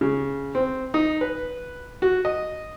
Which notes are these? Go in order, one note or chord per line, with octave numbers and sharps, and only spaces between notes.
C#3
C4
D#4
B4
F#4
D#5